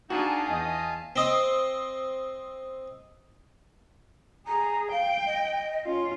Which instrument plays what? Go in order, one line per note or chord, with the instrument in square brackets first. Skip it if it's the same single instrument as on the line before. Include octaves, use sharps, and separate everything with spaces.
[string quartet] D4 G#4 [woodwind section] D#4 [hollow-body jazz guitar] F#4 [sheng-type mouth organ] F5 G#5 A5
[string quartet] E2 [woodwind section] D#5
[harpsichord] C4 D#5 [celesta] D#6 G7
[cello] G#4 [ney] A#5
[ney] F5 [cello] G5
[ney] D#5
[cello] C#4 F4